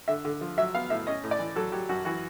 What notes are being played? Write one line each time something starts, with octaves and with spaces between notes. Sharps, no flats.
D3 E5
D3
F3
F#3 E5
B3 F5
A2 E5
C#4 D#5
A2
D5
E3
F#3 A4
F#3 G4
F#2 F#4
E3 F#4